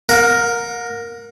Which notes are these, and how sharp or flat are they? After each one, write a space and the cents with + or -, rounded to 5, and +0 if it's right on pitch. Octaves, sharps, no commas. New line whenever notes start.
A#4 +0 F#5 -45